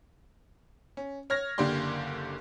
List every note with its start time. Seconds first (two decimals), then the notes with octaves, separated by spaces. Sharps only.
0.97 C#4
1.30 C#5 F6 G#6 A#6
1.58 F#1 D3 A#3 G4 D5 C6